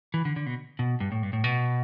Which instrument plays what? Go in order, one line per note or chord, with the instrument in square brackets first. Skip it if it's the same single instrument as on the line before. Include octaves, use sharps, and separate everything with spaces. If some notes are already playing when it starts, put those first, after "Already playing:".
[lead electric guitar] E3
D3
D3
B2
B2
G2
A2
G2
A2
B2